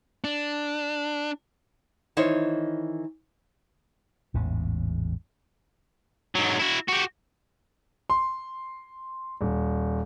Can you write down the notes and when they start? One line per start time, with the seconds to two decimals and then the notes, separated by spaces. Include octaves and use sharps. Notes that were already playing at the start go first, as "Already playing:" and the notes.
0.24 D4
2.17 D#3 E3 D#4 E4 C5 C#5
4.34 A1 E2 G#2 C#3
6.35 G#2 F#3
6.59 E4 F#4
6.88 F#4 G4
8.10 C6
9.41 D#1